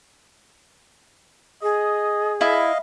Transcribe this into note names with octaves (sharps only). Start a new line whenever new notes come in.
G#4 D#5
E4 D#5 F5